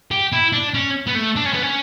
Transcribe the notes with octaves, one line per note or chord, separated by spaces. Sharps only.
G4
E4
D4
C#4
B3
A3
D4
C#4
B3
C#4